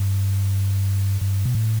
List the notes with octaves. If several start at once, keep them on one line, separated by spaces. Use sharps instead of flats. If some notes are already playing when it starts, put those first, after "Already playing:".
Already playing: G2
G2
B2
A2